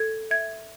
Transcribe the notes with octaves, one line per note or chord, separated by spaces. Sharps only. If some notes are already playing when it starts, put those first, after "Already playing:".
Already playing: A4 G#6
E5 G#6